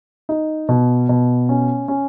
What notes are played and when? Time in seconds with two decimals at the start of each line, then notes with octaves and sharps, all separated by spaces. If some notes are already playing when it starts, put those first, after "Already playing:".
0.29 D#4
0.69 B2
1.09 B2
1.49 C#4
1.88 C#4